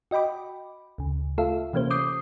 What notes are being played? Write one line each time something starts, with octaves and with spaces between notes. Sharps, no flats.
F#4 D#5 G5 B5 D6
D2 C#3
A3 F4 A4 E5 F5
C3 E3 A#3 C#4 G4 C5
D6 D#6 G6 C7